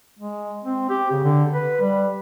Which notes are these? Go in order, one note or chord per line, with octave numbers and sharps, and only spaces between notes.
G#3
C4
G4
C#3
D3
B4
G3